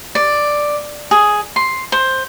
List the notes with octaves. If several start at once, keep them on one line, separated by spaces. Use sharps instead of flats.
D5
G#4
C6
C5